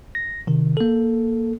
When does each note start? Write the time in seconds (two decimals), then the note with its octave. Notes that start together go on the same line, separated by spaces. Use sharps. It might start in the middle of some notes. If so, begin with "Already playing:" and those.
0.15 A#6
0.47 C3 D#3
0.77 A#3 A4